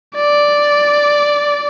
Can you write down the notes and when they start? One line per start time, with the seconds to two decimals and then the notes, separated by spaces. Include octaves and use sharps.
0.15 D5